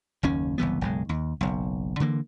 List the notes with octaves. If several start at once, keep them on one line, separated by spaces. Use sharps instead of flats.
F#1 D#2 C#4
F#1 C2 E3 B3
F#1 B1 G#3
D#2
F#1 B1
D3 E3 A#3